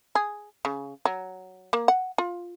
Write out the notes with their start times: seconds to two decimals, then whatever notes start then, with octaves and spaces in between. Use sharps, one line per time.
0.15 G#4
0.65 C#3
1.05 F#3
1.73 A#3
1.88 F#5
2.18 F4